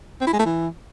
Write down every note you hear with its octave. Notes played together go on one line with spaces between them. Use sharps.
C4
E4
G#3
A3
E3